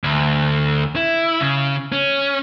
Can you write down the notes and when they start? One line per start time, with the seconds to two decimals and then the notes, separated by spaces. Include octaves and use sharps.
0.04 D2
0.96 E4
1.40 C#3
1.92 C#4